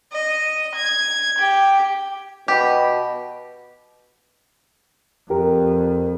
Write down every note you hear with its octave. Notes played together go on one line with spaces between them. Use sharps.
D#5
G#6
G4
B2 G4
F2 G4 A#4